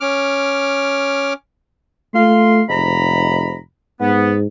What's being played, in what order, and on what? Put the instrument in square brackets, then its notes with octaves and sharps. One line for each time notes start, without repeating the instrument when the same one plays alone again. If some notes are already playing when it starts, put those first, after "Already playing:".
[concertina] C#4 D6 F6
[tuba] A3 [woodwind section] F4 F5 C6
[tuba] F1 [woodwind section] G#2 A#5 B5
[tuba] G#2 [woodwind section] B3